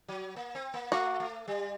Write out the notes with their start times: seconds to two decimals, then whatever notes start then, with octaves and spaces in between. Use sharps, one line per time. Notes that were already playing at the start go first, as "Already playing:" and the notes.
0.08 F#3
0.36 A#3
0.55 C4
0.74 A#3
0.92 A3 F#4
1.20 A3
1.48 G3